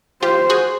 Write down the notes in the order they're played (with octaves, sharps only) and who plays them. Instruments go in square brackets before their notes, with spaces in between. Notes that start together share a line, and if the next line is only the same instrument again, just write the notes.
[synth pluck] F4 G4 [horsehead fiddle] C5
[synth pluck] F#4 G#4